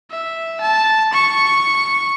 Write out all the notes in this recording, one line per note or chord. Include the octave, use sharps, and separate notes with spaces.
E5
A5
C#6